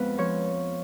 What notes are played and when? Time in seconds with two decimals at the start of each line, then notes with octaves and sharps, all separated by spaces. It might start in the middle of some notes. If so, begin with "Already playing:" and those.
Already playing: F2 G#3 B3 B4
0.18 F3 C#5